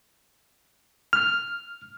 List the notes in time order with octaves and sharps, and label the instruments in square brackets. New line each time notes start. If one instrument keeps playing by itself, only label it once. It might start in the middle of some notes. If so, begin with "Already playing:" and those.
[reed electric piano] F6